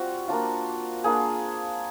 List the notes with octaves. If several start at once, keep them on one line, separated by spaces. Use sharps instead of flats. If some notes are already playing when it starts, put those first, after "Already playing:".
Already playing: G3 C4 F4 F#4
A#3 D4 F4
A#3 D4 F4 G#4